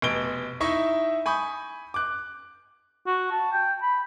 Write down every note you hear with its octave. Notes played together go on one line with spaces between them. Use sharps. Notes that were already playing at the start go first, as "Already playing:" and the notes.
F1 B2 D7 G7
D#4 E4 E5 C#6
G#5 B5 C#6 D#6 G6
D6 F#6
F#4
A5
G5
B5